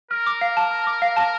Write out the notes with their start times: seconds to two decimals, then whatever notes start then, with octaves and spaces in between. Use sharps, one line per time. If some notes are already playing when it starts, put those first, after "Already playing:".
0.11 A#4 F6
0.27 D6
0.41 F5
0.57 A5
0.71 F6
0.87 D6
1.02 F5
1.16 A5